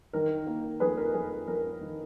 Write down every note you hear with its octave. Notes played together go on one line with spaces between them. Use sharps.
D#3 A#4
A#3
F2 G#4 B4
A#4
F2 G#4
A#4
F2 A#4
D#3